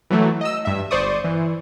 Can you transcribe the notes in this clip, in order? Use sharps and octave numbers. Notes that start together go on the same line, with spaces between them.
E3 F#3 A3
D#5 E6
G2 E5
G1 C5 D5 C#6 D#6
E3